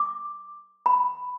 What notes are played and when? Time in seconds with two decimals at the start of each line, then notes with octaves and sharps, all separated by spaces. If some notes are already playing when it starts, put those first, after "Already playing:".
Already playing: D6
0.86 B5